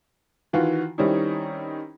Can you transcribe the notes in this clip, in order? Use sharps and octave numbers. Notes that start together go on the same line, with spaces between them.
D#3 E3 F4 F#4
D#3 G3 C4 C#4 D#4 E4